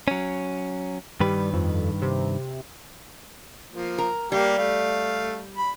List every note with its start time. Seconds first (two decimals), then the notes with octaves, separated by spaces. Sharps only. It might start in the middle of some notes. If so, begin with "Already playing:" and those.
0.08 F#3 C#4
1.20 G2 D#3 G3 B4
1.54 F2
2.02 C3
3.72 F3 A#3
3.98 A#4
4.32 G3 A#3 G4 F5
4.58 A3 F5
5.57 B5